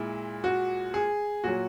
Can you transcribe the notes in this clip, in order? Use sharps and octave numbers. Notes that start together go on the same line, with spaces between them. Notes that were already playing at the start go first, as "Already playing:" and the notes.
Already playing: A#2 G#3 E4
F#4
G#4
A#2 F#3 F#4